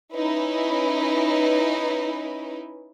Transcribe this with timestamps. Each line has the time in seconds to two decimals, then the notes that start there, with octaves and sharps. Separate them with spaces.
0.13 C#4 D#4 E4 B4